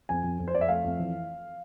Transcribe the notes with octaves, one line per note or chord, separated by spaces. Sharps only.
F2 G#5
F2
F2
C5
F2 D5
E5
A3 F5
F2
E3